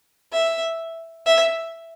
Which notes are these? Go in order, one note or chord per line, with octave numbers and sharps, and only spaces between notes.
E5
E5